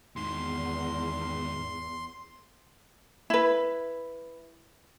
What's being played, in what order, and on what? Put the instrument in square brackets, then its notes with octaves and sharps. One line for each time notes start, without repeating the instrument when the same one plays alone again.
[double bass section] E2 [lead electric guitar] G#2 D#3 [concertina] C6
[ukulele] E4 B4